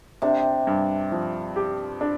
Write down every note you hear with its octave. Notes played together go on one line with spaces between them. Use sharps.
C3 D4
G2
F3
G4
D4